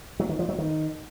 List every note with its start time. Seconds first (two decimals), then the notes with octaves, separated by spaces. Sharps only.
0.20 F#3
0.29 D#3
0.39 F3
0.49 F#3
0.58 D#3